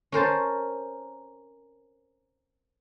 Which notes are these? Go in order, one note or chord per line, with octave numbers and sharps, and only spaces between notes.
C#4 A#4 C5 A5